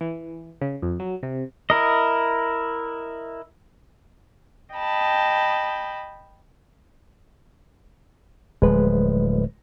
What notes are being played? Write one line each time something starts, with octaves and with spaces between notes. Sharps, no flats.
E3
C#3
F2
F#3
C3
E4 A#4 D#5
D#5 G5 A5 B5
D1 F3 G#3 B4